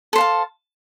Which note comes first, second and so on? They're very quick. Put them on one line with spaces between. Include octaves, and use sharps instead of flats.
A4 C5 F5 A5